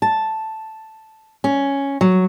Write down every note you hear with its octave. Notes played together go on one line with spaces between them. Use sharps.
A5
C#4
F#3